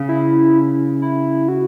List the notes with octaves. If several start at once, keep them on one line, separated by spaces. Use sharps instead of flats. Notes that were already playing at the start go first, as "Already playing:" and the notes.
Already playing: C#3
E4
E4
F#4